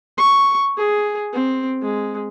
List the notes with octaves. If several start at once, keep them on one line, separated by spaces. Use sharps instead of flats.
C#6
G#4
C4
G#3